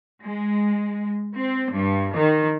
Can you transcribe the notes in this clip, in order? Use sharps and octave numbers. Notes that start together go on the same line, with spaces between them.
G#3
C4
G2
D#3